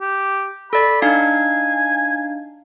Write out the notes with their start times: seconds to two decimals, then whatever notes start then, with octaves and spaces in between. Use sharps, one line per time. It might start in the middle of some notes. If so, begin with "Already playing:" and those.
0.01 G4
0.73 A4 D5 B5
1.02 D4 D#4 F5 G#5